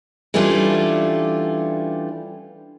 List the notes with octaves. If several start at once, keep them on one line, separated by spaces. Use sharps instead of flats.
E3 G3 A3 C#4 D4 F4